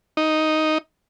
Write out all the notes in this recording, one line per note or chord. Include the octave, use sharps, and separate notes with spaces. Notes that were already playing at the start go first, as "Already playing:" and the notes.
D#4